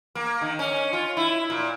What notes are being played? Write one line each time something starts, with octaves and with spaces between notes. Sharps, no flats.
A#3
D#3
C#4
F4
E4
A#2